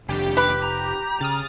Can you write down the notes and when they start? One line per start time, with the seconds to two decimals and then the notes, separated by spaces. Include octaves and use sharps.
0.09 F1 D#2 D4 G4
0.37 B4
0.63 A#5
1.21 C#3 D#6 F6 A6